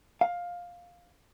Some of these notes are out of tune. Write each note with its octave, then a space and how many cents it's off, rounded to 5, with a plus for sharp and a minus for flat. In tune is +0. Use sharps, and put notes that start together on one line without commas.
F5 +10